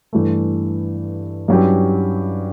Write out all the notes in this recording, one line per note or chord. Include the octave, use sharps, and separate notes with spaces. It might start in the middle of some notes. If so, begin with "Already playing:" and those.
G2 E3 A3
G2 F#3 C#4 E4 G4